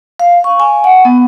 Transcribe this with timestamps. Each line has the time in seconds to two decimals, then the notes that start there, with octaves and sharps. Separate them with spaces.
0.19 F5
0.44 C#6
0.60 G#5
0.84 F#5
1.05 B3